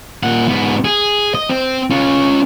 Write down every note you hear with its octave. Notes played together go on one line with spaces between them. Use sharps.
A#2 F#5
G#2 B3
G#4
D#5
C4
C#4 F4